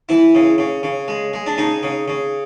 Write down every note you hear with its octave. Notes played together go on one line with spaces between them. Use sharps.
E3 E4
C#3
C#3
C#3
G#3
G#3
D4
C#3 D#4
C#3
C#3